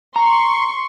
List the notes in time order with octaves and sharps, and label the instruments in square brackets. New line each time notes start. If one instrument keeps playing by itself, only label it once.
[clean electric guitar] A#5 [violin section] C6 C#6